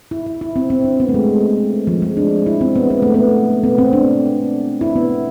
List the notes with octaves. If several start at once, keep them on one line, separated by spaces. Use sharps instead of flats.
E4
E4
E4
C4
C4
D4
B3
A3
G#3
F3
G#3
D4
E4
C4
B3
B3
A3
B3
B3
C4
D4
E4
B3